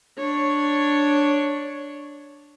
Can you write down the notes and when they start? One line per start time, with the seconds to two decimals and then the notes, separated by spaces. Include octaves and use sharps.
0.17 D4 C#5